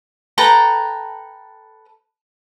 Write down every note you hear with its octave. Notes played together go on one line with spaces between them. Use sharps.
A4 B4 G5 A#5